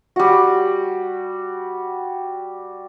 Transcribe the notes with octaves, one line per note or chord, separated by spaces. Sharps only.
G3 F#4